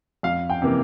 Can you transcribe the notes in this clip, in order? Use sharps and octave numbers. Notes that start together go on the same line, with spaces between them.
F2 F5
G5
C3 E3 A#3